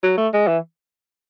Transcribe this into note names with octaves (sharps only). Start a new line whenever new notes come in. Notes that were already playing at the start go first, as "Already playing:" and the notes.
F#3
A3
G#3
E3